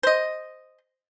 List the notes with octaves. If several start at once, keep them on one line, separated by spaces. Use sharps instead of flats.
C5 D#5